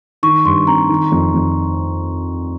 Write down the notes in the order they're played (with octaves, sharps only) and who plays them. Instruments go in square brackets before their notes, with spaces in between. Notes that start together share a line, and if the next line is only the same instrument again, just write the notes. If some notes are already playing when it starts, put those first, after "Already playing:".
[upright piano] D#3 [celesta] C#6
[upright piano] G2 [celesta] C6
[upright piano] C4 [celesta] A#5
[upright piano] D#3
F2
F2